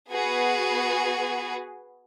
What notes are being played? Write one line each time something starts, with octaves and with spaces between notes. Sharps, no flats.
B3 F#4 G#4 B4